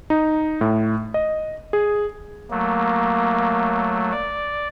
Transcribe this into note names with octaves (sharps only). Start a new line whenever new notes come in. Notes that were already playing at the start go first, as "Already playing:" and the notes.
D#4
A2
D#5
G#4
F#3 A3 A#3
D5